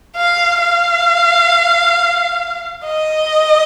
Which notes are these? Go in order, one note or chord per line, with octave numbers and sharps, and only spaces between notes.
F5
F5
D#5